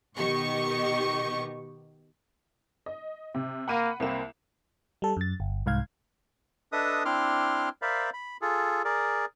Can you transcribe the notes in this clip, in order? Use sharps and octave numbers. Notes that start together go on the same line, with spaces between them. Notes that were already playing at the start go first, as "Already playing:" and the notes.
B2 D#3 G4 D#5 C#6
D#5
C3
A#3 F#5 B5 D#7
C2 A#3 C4 E4 E7
G3 A4
F#2 A6
G1
C2 G#2 F5 G#6
D4 A4 B4 D#5 E5 D#6
C4 D4 E4 C6 D6 F6
A#4 C5 D5 E5 F5 B5
B5
F4 G#4 A4
G#4 A#4 D5